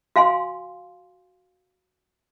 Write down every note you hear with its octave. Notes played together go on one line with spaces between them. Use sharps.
F#4 F5 G#5 C6